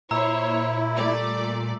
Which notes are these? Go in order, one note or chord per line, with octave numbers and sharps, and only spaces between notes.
A#2 E4 C5 C#5 A#5 E6
G3 A3 D5